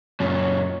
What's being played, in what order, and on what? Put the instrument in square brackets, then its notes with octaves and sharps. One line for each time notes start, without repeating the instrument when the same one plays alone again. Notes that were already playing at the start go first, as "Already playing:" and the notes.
[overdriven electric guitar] C#2 A#2 [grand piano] F#2 [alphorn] C#5